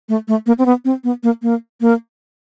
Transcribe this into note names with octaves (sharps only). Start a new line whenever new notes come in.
A3
A3
A#3
C4
B3
C4
B3
A#3
A#3
A#3